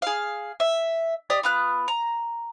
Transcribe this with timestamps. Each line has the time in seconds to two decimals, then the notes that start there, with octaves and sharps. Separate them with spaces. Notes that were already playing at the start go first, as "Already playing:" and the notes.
0.02 G#4 F5
0.60 E5
1.30 G4 D5 D#5 D#6
1.43 B3 F4 F#6
1.88 A#5